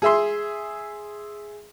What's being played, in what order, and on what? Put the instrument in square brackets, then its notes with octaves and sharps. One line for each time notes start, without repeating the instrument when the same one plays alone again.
[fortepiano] G#4 E5 C6